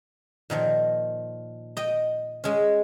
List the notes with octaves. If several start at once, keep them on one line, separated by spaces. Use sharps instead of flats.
A#2 D#3 F3
D#5 G5
G#3 C#4